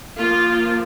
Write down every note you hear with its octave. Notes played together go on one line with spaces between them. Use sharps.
F3 A#3 F4